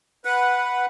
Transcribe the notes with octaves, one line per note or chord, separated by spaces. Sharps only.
B4 F#5 F#6